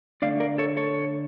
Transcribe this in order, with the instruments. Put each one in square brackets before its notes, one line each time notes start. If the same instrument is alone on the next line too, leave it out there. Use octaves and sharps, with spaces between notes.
[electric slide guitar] D3 A3 D4 D5 F5
A#4 D5
A4 C#5
A4 C#5